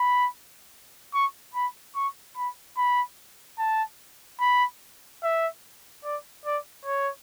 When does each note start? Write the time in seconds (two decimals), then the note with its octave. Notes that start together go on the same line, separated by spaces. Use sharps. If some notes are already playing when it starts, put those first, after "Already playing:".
Already playing: B5
1.14 C#6
1.55 B5
1.96 C#6
2.36 B5
2.77 B5
3.59 A5
4.40 B5
5.23 E5
6.04 D5
6.46 D5
6.86 C#5